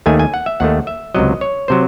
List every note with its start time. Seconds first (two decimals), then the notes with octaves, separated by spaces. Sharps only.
0.06 D#2 D#3 A3 G#5
0.19 G#5
0.34 F#5
0.46 E5
0.60 D#2 D#3 A3 F#5
0.87 E5
1.14 C#2 C3 F#3 D#5
1.41 C#5
1.68 C3 F#3 C5